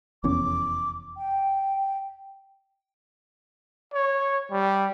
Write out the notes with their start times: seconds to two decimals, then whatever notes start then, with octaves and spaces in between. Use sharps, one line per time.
0.24 F1 E2 C#4 D6
1.17 G5
3.93 C#5
4.51 G3